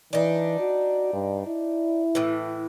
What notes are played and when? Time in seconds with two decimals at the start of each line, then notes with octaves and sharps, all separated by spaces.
0.13 E3 D4 D#4
0.60 F#4
1.13 G2
1.46 E4
2.15 A2 E3